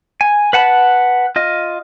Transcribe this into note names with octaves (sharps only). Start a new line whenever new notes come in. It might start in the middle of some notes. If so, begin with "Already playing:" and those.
G#5
B4 F#5 A5 B5
F4 D#5